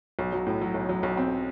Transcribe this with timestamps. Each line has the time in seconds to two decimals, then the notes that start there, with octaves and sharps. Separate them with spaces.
0.19 B1
0.32 F#3
0.47 A2
0.61 F#3
0.74 B1
0.89 F#3
1.03 B1
1.17 C4